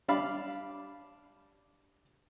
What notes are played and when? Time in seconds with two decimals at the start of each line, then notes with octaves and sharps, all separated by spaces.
0.08 G3 D4 D5 F5 B5